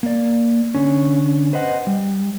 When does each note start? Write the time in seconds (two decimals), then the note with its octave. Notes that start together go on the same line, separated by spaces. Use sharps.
0.03 A#3 D5
0.75 D3 C#4
1.53 B4 C5 D#5 F#5
1.87 G3